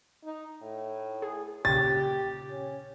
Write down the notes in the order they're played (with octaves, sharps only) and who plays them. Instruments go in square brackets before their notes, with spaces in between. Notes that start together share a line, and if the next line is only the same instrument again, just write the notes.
[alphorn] D#4
A2
[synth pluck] G#4
[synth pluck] A#2 C#3 [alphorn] G4 [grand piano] A6
[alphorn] C#4